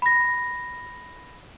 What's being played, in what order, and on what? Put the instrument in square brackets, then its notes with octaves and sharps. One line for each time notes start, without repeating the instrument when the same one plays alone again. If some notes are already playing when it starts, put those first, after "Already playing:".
[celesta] B5 A#6